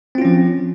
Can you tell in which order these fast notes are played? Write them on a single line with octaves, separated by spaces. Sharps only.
C4 F4 C#4 F3